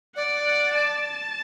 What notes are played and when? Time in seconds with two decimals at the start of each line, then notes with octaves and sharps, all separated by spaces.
0.15 D5 F#5
0.46 F#5
0.75 A5